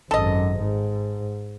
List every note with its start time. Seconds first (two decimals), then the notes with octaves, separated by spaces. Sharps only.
0.11 G#1 F#2 A4 D#5
0.59 G#2